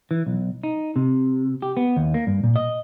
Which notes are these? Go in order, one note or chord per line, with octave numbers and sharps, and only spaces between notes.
E3
B1
D#4
C3
G4
B3
D#2
A#3
G2
A#2
D#5